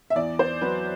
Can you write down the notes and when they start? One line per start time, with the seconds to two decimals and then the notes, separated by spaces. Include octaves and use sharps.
0.10 E5
0.16 E2 D5
0.39 C5
0.61 F#3 B4